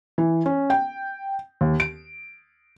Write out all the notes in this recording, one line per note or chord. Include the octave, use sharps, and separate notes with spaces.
E3
C#4
G5
D#2
D7